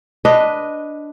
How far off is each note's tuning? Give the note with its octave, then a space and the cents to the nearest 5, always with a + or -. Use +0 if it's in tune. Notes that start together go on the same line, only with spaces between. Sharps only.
D4 +0 B4 +0 D#5 +0